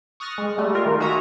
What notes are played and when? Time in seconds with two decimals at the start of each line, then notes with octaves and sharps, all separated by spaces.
0.20 C#6 D#6 F6 F#6 A6 A#6
0.38 G#3
0.58 G3 A3
0.74 F4 A#4
0.86 D#3
1.00 F#4 E5 G#5 A#5 D#6